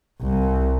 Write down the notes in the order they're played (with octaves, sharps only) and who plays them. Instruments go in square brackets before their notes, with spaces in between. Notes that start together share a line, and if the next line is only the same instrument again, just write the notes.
[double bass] C2